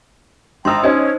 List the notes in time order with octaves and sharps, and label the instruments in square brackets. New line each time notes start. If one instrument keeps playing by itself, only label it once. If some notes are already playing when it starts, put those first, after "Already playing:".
[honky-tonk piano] G#1 E6 [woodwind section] G5 A5 A#5 [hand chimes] C6 D#6
[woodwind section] C#4 [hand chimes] D#4 C5 [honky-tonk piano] C#5 D#5 G#6